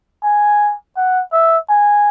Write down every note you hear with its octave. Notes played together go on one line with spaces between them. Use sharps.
G#5
F#5
E5
G#5